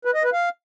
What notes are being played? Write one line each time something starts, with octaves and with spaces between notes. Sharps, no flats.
B4
D#5
B4
F5